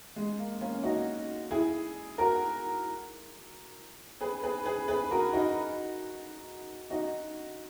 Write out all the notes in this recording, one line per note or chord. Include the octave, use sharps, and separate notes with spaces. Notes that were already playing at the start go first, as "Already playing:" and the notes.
G#3
A#3
A#3 C#4
D#4 F#4
E4 G#4
F#4 A#4
G#4 B4
G#4 B4
G#4 B4
G#4 B4
F#4 A#4
D#4 F#4
D#4 F#4